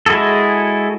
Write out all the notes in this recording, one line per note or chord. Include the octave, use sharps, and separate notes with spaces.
G#3 E4 F#4 G#4 A4